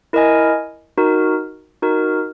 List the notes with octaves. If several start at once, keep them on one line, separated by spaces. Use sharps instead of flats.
E4 A#4 D#5 G#5
D#4 F#4 A#4
D#4 F#4 A#4